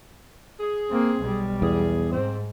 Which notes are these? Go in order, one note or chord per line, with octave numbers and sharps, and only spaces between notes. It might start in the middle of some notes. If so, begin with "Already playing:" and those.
G#4
A#3 C4
B1 G3
E2 G#4
G#2 C4